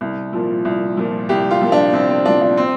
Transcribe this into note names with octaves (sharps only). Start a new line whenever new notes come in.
C2
A#2 F3
C2
A#2 F3
C2 G4
F4
A#2 F3
D4
C2 C4
C4
A#2 F3 D4
D4
C4